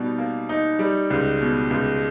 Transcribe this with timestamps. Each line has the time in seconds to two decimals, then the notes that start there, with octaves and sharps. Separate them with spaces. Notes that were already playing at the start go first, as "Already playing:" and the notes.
Already playing: B2 G3 D#4
0.18 A#3
0.49 D#4
0.79 G3
1.10 C#2
1.41 B2
1.71 C#2